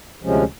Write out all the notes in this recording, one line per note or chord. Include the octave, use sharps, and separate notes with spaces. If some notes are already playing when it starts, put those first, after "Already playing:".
D2 C3 F3 G#3 C#4